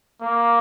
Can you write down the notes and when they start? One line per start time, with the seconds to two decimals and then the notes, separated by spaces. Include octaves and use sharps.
0.22 A#3